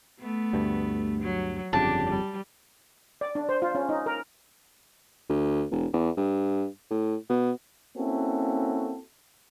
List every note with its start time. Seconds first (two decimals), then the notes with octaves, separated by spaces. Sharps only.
0.20 A3 B3
0.53 D2 G2
1.22 F#3
1.73 G1 F2 C#3 D4 G4 A5
2.10 G3
3.21 D5
3.35 D4
3.49 C5
3.62 F4
3.75 C#4
3.89 D#4
4.06 A#4
5.29 D2
5.71 E1
5.93 E2
6.17 G2
6.90 A2
7.29 B2
7.97 A#3 C4 C#4 E4 F#4 A4